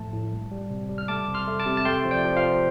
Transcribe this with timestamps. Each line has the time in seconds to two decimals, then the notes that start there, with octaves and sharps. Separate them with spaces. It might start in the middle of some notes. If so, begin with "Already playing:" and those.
Already playing: A2 F3 A3 A5
0.12 A2
0.31 G3
0.52 G3
0.70 C3
0.89 G3
0.98 F6
1.08 A3 A5 D6
1.27 C3
1.34 C6 F6
1.47 A3
1.59 A5 D6
1.66 C3
1.77 A5
1.85 A3 G5 C6
2.05 F3
2.11 D5 G5
2.24 F3
2.36 C5 F5
2.43 F3